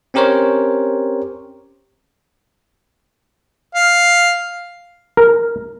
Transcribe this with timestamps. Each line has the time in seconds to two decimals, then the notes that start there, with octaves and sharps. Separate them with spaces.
0.14 C4 C#4 G4 A#4 C5 C#5
3.75 F5
5.17 A#4